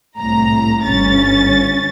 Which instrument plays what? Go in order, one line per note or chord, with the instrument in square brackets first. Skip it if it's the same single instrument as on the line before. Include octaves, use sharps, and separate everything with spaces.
[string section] C2 A2 A#5
G1 C#4 A6